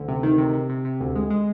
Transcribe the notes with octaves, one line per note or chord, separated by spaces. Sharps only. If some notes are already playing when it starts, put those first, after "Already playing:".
Already playing: D2
C3
D#3
C3
C3
C3
C3
D2
G#3
G#3